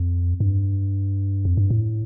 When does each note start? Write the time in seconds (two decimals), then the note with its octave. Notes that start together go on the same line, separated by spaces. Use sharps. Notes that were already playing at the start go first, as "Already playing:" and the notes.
Already playing: F2
0.40 G2
1.45 F2
1.57 G2
1.70 A2